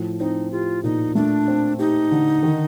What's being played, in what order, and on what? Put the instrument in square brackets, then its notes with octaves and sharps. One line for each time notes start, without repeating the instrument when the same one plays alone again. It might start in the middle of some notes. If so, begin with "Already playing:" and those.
Already playing: [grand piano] A2 F3
[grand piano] C4 [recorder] D#4
[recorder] F4 [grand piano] G4
[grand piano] A#2 [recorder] D#4
[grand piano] A3 [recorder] D4
[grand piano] C4
[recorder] D#4 [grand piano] G4
[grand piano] D3
D#3